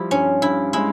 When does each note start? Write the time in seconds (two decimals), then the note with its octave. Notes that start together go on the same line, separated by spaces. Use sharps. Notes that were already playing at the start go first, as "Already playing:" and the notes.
Already playing: F3 G3 E4
0.11 G2 C#4
0.42 G2 E4
0.73 G#3 E4